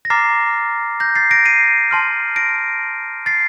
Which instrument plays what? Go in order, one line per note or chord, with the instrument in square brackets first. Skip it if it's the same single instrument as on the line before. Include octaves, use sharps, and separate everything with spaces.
[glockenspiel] A#6
A#5 D6 F6 A6 C7
G6 A#6
A6 C7
A#6 D7
C7 D#7
A5 C6 F6
A#6 D7
A6 C7